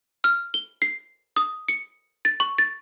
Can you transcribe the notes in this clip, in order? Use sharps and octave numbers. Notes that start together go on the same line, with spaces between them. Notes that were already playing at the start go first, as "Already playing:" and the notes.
F6
G7
C7
D#6
C#7
A6
C#6
A6